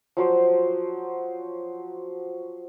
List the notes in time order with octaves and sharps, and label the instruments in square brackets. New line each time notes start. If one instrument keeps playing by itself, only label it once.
[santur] F3 F#3 C5